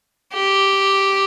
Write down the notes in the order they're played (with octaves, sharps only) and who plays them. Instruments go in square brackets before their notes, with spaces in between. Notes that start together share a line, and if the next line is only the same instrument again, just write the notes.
[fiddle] G4